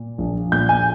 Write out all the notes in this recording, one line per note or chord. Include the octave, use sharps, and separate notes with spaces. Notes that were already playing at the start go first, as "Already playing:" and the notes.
Already playing: A#2
A#1
A#2 G6
G#5